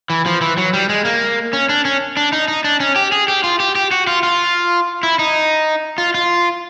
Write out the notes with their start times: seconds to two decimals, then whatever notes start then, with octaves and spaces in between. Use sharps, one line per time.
0.10 E3
0.26 F3
0.41 E3
0.58 F#3
0.73 G3
0.89 G#3
1.05 A#3
1.53 C#4
1.69 D4
1.85 C#4
2.17 D4
2.33 D#4
2.48 D#4
2.64 D4
2.80 C#4
2.96 G4
3.12 G#4
3.28 G4
3.44 F4
3.60 G4
3.75 G4
3.91 F#4
4.07 F4
4.23 F4
5.03 E4
5.19 D#4
5.98 F4
6.14 F4